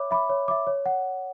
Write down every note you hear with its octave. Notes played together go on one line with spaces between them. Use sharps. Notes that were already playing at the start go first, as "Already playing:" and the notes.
Already playing: C#5 E5 B5 D6
E5 B5 D6
C#5
E5 B5 D6
C#5
F#5